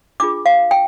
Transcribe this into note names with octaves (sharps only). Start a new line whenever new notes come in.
D4 F4 G#4 D6
F5
G5